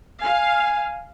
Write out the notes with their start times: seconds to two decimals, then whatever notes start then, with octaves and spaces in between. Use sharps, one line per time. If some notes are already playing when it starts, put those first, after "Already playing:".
0.22 F5 G#5